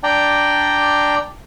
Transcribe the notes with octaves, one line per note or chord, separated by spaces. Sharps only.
D4 D5 G5 A#5